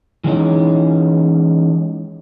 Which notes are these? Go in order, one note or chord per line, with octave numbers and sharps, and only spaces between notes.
E3 G#3 C#4 D#4